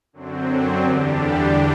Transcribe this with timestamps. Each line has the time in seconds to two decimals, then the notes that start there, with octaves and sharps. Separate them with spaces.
0.13 F#2 D3 F#3 C4
0.83 E2 D3 G3 D4 G4